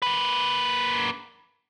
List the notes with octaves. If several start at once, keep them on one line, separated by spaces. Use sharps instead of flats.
A#3 B4